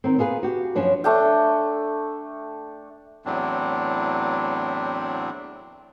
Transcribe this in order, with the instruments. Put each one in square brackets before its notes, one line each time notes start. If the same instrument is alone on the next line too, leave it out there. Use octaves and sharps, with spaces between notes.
[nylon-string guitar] D#3 C4
B3 F4 G#4 A#4 B4
F#4 G4
F#2 F3 C#4 D4 B4
[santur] A3 D4 G5
[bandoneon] E2 A2 F#3 C4 D4